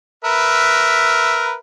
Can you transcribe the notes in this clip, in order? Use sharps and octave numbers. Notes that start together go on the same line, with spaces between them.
A#4 B4 E5